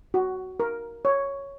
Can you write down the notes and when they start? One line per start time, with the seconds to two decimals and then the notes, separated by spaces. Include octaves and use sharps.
0.14 F#4
0.60 A#4
1.05 C#5